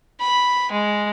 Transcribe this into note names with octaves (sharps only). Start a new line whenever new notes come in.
B5
G#3